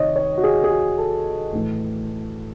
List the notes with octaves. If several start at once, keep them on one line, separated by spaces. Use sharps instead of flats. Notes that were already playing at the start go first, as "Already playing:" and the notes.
Already playing: C3 D#3 C#5 D#5
C#5
F#4
G#4
G#4
F#4
A4
A2 E3